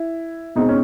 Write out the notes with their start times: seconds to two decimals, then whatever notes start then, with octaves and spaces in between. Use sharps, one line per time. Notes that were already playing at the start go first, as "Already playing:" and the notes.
Already playing: E4
0.55 B2 G#3 C4 D#4
0.69 C#4